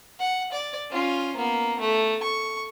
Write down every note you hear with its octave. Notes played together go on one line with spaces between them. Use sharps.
F#5
D5
C#4 F4
A#3 B3
A3
C#6